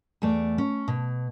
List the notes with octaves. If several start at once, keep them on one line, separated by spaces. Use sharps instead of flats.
E2 A3 D5
C#4
B2